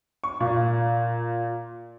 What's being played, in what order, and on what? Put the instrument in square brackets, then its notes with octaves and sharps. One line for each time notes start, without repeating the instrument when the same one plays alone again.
[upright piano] C#6
A#2